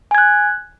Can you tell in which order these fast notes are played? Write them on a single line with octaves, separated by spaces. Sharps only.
G#5 G#6 F#6